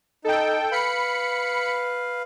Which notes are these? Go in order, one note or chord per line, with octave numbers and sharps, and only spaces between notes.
D#4 A4 G5
B4 F5 B5 C#7